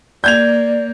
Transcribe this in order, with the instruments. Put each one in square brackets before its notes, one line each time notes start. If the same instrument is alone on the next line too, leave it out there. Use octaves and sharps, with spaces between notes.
[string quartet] A#3 [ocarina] D5 [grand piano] G6 G#6 F7